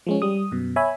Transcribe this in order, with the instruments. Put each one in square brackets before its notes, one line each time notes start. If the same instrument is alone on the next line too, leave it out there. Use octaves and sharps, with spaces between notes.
[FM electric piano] F3 G#3 C#4
G3 D#6
F#2 B2
C#5 E5 G#5 B5